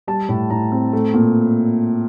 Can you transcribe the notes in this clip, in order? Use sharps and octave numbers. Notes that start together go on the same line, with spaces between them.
G3 A5
A2
A2 A#5
C4
A3
A#2